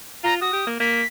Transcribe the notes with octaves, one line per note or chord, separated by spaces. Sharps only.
F4 A#5
F#4 D#6
G4
A#3
A#3 B6